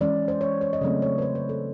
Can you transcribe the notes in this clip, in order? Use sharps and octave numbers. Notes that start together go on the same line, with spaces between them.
E3 G#3 C#4 D5
C5
C#5
C#5
D#5
C#3 F#3 A3 C4 D5
C#5
B4
C5
B4
A4